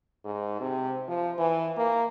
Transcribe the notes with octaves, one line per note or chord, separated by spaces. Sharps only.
G#2
C3
F3
E3
A#3